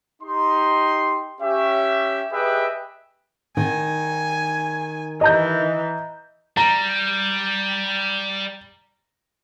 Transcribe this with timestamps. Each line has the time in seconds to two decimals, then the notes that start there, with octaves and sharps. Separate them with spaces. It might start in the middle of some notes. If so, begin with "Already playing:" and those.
0.22 D#4 G4 C6
1.41 C#4 G4 E5
2.32 G4 G#4 B4 D#5 E5 G5
3.57 D#3 G#5
5.21 E3 D#5 A#5 G6
6.57 G3 A#5